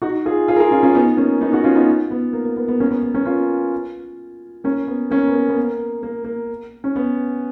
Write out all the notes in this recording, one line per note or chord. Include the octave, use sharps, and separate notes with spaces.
D#4 F#4
F4 G#4
F4 G#4
A#4
F4 G#4
C#4 F4
C#4 F4
B3 D#4
A#3 C#4
B3 D#4
D#4 F#4
C#4 F4
B3 D#4
B3
A#3
A#3
B3
B3
A#3 C#4
B3
B3
A#3 C#4
C#4 F4
A#3 C#4
B3
A#3 C#4
B3
A#3
B3
A#3
A#3
A#3
C#4
B3